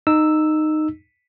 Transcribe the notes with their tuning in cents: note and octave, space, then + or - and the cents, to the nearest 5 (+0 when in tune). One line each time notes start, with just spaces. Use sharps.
D#4 -15 E6 +0